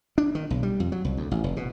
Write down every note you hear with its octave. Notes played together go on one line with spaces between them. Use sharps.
D4
D#3
B1
G3
F2
F#3
C2
D2
A1
F1
B2